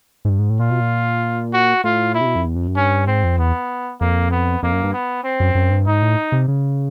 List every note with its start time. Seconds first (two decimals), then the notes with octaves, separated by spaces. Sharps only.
0.25 G#2
0.29 G2
0.39 G#2
0.50 A2
0.60 A#2 F4
0.70 B2
0.81 A#2
1.54 F#4
1.84 A2 F4
2.15 A#2 E4
2.21 C3
2.26 B2
2.36 F2
2.46 E2
2.56 F2
2.67 F#2
2.77 G2 C#4
3.07 G#2 C4
3.24 F2
3.38 E2 B3
4.00 F2 A#3
4.31 B3
4.63 F2 A#3
4.73 F#2
4.84 G2
4.93 B3
5.24 C4
5.40 F#2
5.55 F#2
5.71 G2
5.87 G#2 D#4
6.02 A2
6.32 C3
6.48 C#3